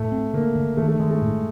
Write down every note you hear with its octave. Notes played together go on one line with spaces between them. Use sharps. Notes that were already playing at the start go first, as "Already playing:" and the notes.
Already playing: A2 A3
C4
D3 A#3
D3
D#3 A3
A3
D#3 G#3
A3
A2